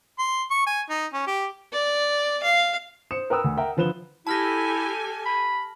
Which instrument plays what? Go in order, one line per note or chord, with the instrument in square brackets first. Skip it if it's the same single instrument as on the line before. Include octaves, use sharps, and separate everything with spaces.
[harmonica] C6
C#6
G#5
D#4
C#4
G4
[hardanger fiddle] D5
F5
[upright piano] C5 D#6 C#7 E7
A#4 B4 G5 D#6 E6
D2
A#4 E5 F#5 G5 A#5
D3 F3 B4 E7 G7
[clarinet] E4 [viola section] G4 A4 G#5 [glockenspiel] A5 F6 A#6
[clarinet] B5